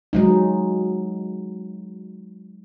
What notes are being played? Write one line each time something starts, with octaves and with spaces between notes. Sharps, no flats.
F#3 G#3 D#4